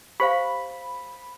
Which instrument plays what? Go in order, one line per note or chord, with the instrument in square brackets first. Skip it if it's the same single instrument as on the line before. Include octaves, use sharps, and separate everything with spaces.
[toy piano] G4 C5 F5 [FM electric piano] B5